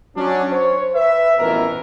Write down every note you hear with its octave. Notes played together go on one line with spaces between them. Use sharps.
F#3 C#4 D4
C5 C#5
B4 E5
A1 F2 B2 E3 A#4 E5